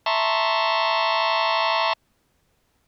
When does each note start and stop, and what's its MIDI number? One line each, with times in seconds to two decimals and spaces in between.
0.06 1.93 76
0.06 1.93 81
0.06 1.93 82
0.06 1.93 84
0.06 1.93 85